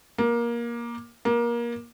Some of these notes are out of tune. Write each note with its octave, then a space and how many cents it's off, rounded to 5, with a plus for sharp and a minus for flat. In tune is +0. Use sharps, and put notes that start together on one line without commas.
A#3 +20
A#3 +25